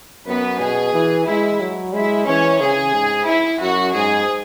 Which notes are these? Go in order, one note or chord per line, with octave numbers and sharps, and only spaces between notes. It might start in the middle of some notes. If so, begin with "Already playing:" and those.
F#2 B3 B4
B2 G#4
E3
G#3 E4
F#3
G#3 E4
E3 C#4 C#5
C#3 G#4
G#2
E4
F#2 F#4
G#2 G#4